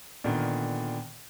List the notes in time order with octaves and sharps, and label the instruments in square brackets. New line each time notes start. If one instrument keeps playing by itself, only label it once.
[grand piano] A#2 D3 D#3 B3